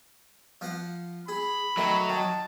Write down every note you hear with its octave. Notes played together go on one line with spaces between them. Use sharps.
F3 F5 F#5
G#4 B5
D#3 F#3 A3
D#3 A5